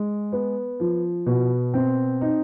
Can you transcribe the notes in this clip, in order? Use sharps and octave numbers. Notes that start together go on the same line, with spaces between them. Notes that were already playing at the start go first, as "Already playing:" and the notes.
Already playing: G#3
B3
F3
B2
C4
D#4